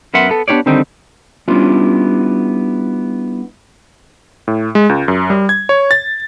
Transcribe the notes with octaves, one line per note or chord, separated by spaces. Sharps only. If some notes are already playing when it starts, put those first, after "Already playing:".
F#2 B3 A#4 E5 F#5 C6
B3 A4
B3 D4 F4 G4 C#5 D5
D3 D#3 G3 C4 D#4
G3 B3 C#4 D4 E4 F4
A2
G#3
C#2
F#2
G3
G#6
C#5
A6